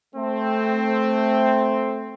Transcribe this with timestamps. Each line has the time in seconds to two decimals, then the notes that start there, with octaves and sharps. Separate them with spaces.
0.15 A3 C4